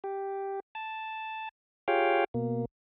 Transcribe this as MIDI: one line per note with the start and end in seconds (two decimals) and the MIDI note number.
0.04 0.60 67
0.75 1.49 81
1.88 2.24 65
1.88 2.24 67
1.88 2.24 68
1.88 2.24 73
1.88 2.24 77
1.88 2.24 79
2.34 2.65 47
2.34 2.65 58